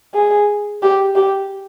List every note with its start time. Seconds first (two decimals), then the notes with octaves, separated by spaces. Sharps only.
0.14 G#4
0.82 G4
1.15 G4